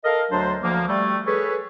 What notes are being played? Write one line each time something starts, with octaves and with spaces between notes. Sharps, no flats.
A4 A#4 D#5 F5
D2 F#3 D4 C5
D2 F3 A#3
G3 A3
G#4 A4 B4 C#5